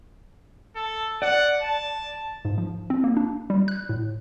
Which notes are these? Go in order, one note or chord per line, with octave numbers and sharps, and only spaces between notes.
A4
D5 F#5
A5
G#2
F3
C4
A#3
D4
G3
F#6
A2